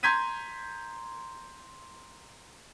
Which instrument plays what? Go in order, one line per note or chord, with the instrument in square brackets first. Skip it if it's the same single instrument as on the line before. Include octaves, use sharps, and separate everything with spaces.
[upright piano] A#5 C6 G6 G#6 B6 D#7